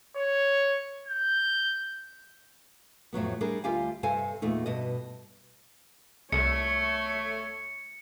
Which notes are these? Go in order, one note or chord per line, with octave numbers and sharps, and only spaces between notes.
C#5
G6
F2 A2 F#3 B3
G3 D4 G#4 A#4
D2 G3 F4 G4 F5 G#5
G2 C3 A4 C5 F5 G#5
E2 A#2 A3 D#4
G2 B2 D#5
C2 A3 C#5 C#7